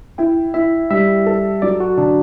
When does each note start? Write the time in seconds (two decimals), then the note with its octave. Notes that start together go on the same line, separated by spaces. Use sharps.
0.18 E4 G5
0.54 E4 E5
0.90 G3 E5
1.26 A4
1.62 F#3 D5
1.80 F#4
1.98 D3 D4